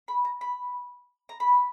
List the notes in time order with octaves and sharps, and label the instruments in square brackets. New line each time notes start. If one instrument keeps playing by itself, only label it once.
[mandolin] B5
A#5
B5
A#5
B5